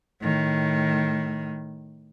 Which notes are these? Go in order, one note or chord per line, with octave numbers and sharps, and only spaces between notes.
A2 D#3